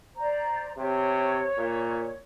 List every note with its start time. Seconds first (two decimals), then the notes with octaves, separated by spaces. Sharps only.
0.16 C5 D5 A#5
0.77 C3 C#5
1.58 A#2